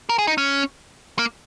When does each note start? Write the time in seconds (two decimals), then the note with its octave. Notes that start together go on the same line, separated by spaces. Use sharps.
0.09 A#4
0.19 G#4
0.27 D#4
0.38 C#4
1.19 A#3